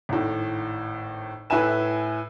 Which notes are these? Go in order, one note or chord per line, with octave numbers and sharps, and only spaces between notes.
G#1 A2
A2 B4 E5 G#5 E7